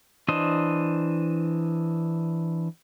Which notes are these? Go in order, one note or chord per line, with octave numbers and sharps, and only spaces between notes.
E3 D4 C5 D#5